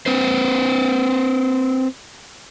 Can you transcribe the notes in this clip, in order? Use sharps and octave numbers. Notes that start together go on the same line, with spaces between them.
C4 B4 C5